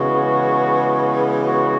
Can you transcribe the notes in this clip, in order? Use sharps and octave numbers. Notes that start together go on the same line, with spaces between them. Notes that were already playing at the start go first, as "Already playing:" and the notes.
Already playing: C#3 E3 G#3 B3 F#4
F#4